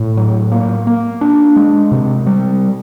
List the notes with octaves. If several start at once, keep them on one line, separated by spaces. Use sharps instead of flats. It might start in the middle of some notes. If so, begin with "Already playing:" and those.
Already playing: A2
F#3
A#3
A#3
D4
G#3
C3
G3